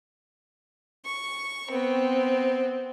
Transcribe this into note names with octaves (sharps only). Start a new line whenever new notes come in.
C#6
B3 C4